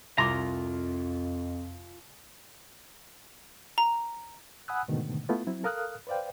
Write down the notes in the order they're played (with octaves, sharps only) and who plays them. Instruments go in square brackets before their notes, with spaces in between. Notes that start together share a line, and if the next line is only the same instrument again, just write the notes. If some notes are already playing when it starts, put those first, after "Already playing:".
[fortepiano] C2 C6 D6 [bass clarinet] F2 [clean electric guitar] F4 A#5
[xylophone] A#5
[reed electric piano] F#5 G#5 B5 D#6 E6 F#6
G#2 B2 D3 D#3 A3
A3 B3 E4 F4
F#3 C4 E4
A4 A#4 F5 D#6 F6 F#6
B4 C5 D5 F5 G5